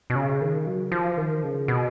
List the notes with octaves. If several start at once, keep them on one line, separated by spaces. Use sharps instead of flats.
B2
C#3
D#3
F#3
F3
D#3
C#3
B2